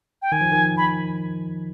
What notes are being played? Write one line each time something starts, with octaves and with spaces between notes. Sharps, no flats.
G5
D#3 G#5
F3
D#3
B5